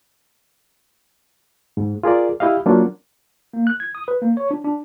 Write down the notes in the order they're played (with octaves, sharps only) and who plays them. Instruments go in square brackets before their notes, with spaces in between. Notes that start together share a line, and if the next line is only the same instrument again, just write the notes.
[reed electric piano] G#2
F4 G#4 A#4 D5
E4 G4 D#5 F5
F#3 A#3 C#4 D4 F4
[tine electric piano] A#3
F#6
G#6
D#6
B4
A#3
C#5
D4
D4